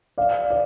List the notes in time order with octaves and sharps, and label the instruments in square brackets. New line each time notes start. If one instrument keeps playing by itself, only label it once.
[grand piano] D5 F5
D5